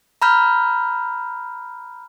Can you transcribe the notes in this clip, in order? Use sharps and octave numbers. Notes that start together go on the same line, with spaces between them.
A#5 B5 F6 G6